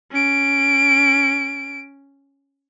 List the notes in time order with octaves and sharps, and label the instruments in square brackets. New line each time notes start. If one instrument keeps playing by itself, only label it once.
[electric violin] C#4 D7